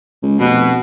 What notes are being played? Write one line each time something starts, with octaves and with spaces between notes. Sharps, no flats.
C#2
F1 B2